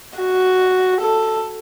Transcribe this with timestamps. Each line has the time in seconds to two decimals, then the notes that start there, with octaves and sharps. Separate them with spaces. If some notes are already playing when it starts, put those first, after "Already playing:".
0.18 F#4
1.01 A4